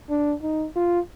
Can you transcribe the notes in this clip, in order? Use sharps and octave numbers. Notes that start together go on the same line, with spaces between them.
D4
D#4
F4